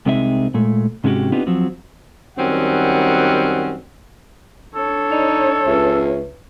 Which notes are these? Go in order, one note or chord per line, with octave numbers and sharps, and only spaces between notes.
C2 C3 G#3 C4 D#4 E5
A#2 G#3 A3
G#2 C3 G#3 C#4 F#4 G4
B3 C4 D4 D#4 F4 G4
F3 F#3 C4
F#2 D#3 G3 C4 C#4 F#5
D4 A4 C#5
D#4 D5 D#5 F7
C#2 B4 E5